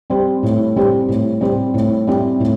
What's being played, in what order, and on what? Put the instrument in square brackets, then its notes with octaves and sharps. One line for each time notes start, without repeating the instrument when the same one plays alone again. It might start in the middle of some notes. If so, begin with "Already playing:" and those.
[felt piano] G3 C4 G4 C5
A2
G3 C4 G4 C5
A2
G3 C4 G4 C5
A2
G3 C4 E4
A2